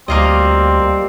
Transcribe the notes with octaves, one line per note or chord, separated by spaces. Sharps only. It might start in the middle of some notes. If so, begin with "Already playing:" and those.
D2 G3 A#3 C4 F4 D#5